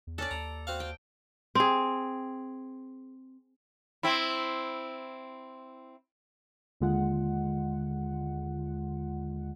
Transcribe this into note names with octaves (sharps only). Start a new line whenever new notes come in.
E2
C#4 D4 A4 D5
D#2 A#5
C4 F#4 F5
G5
C4 G#4
C4 E4
D#2 D3 G#3 F4 F#5